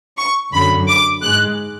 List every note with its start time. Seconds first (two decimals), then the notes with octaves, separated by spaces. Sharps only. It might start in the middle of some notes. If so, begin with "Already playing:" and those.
0.18 C#6
0.53 F#2 D3 F#3 B5
0.88 D6
1.23 G#2 G#3 F#6